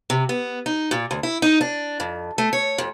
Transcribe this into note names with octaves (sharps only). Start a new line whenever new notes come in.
C3
B3
D#4
A#2
D2
E4
D#4
D4
F2
A3
C#5
F2